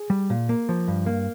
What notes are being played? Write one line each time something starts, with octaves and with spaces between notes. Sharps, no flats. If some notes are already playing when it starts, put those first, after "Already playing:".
Already playing: G#4
G3
A#2
A#3
F3
G2
A#3